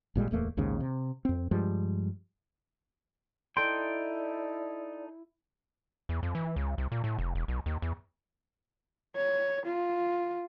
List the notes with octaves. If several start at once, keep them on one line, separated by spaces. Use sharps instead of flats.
G#1 A#2 G3 G#3
D1 E2 A3 A#3
A#1 D#2 G#2 C#3
C3
F2 C4
G2 F3 G3 G#3
D#4 E4 A4 D5 G5 C6
E2
F2
E3
C#2
C2
A#2
A2
F1
E1
B1
D#2
E2
C#5
F4